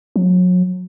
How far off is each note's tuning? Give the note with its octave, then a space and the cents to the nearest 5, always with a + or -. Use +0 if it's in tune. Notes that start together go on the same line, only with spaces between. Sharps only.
F#3 -35